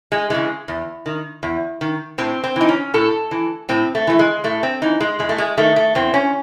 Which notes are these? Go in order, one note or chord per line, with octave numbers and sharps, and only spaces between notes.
G#3
C#3 E3 G#3
E2
D#3
E2
D#3
A2 C4
C4
E3 D#4
C#4
A2 A4
E3
A2 C4
A3
E3 A3
G#3
A2 A3
C4
E3 D#4
G#3
E2 G#3
A3
G#3
D#3 A3
A3
E2 C4
C#4